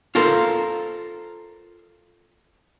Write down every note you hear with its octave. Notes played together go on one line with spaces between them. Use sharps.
F4 A4 A#4 C5